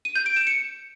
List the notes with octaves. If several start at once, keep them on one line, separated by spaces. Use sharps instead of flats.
D#7
G6
D7
E7
C#7